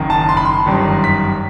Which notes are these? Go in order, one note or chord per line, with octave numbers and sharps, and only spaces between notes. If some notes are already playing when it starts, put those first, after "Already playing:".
Already playing: F#1 F#2 D#3
A5
C6
B5
C6
G1 F#2 D#3 G3
B6